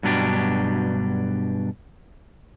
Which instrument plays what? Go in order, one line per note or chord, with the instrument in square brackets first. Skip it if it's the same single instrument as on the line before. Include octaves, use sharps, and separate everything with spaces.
[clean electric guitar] G2 B2 F#3 D4 G4